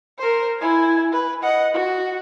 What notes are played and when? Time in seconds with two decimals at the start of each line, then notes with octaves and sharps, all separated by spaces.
0.18 A#4 C5
0.59 E4 G#5
1.12 B4
1.42 D#5 F#5
1.74 F#4